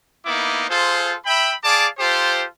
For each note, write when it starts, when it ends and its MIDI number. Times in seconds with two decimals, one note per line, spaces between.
0.25 0.66 58
0.25 0.66 59
0.25 0.66 63
0.25 0.66 64
0.25 0.66 86
0.69 1.14 65
0.69 1.14 68
0.69 1.14 69
0.69 1.14 72
1.25 1.52 76
1.25 1.52 79
1.25 1.52 83
1.63 1.87 68
1.63 1.87 74
1.63 1.87 77
1.63 1.87 81
1.63 1.87 86
1.97 2.44 65
1.97 2.44 67
1.97 2.44 69
1.97 2.44 72